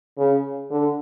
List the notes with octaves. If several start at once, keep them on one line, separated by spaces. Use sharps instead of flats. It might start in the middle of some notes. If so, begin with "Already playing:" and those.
C#3
D3